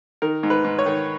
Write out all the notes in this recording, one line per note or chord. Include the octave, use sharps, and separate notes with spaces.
D#3 A#4
G#2
B4
G#2
C#5
D#3